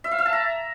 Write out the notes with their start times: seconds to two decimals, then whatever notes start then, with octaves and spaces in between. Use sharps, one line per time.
0.04 E5
0.11 F5
0.18 E5
0.26 A5
0.33 A#5